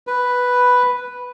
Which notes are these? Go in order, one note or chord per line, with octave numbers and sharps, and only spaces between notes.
B4